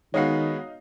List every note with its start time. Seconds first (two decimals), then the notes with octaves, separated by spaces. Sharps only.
0.14 D#3 G#3 B3 D#4 F#4 C#5 F5 C7